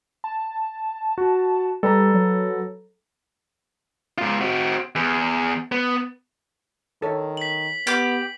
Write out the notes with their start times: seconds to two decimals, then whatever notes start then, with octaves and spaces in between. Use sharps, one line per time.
0.24 A5
1.18 F#4
1.83 G3 A4 B4 A#5
2.14 F#3
4.18 G#2 F4
4.41 C4 F#4
4.96 E2
5.72 B3
7.02 D#3 A4 C#5
7.37 B6 F#7
7.87 B3 G4 D6